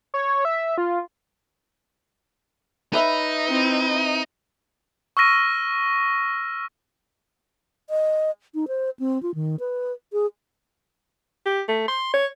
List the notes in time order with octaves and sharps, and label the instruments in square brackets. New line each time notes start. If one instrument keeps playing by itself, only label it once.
[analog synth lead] C#5
E5
F4
[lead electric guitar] D#4 [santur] B4 E5 B5
[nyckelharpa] C4 E4
[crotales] C#6 E6 F6 A#6 D#7
[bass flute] D#5
D#4
C5
C4
F4
D#3
B4
G#4
[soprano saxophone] G4
A3
C6
C#5